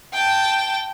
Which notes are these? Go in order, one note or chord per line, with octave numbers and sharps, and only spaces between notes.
G5 A5